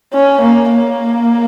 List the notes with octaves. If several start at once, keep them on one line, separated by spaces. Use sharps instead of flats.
C#4
A#3
A#3